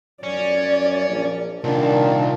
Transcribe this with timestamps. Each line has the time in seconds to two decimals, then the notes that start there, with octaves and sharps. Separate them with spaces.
0.23 F#2 C#4 D5
1.09 A#1
1.64 C2 A#2 D#3 D4 A5